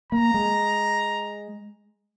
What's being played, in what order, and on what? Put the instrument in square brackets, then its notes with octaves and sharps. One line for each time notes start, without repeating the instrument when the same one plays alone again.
[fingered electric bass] A#3 [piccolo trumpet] A#5
[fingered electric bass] G#3